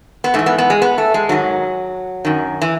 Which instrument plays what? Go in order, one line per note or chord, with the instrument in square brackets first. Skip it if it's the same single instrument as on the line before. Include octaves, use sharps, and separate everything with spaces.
[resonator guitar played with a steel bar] B3
G#2 E3 A3
B3
B3
G#3
B3
A3
G#3
G#2 D#3 F#3
F#2 D#3
E3